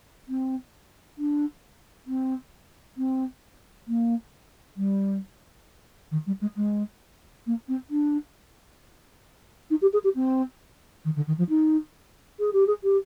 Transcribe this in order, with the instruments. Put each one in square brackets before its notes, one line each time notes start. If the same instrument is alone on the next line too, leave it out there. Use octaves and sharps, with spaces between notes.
[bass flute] C4
D4
C4
C4
A#3
G3
D#3
G3
G#3
G#3
A#3
C4
D4
D#4
G4
G#4
G4
C4
D#3
D3
D#3
F3
D#4
G#4
G4
G#4
G4